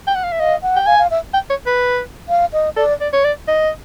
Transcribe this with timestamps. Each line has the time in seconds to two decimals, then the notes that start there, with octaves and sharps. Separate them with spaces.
0.07 G5
0.15 F#5
0.24 F5
0.32 E5
0.39 D#5 F5
0.62 F#5
0.76 G5
0.86 F5 G#5
0.99 F5
1.11 E5
1.34 G5
1.50 C#5
1.66 B4
2.29 F5
2.53 D#5
2.76 A4 D5
3.01 D5
3.13 C#5
3.25 D5
3.48 D#5